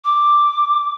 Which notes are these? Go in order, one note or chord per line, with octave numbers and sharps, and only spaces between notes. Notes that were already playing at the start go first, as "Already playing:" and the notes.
D6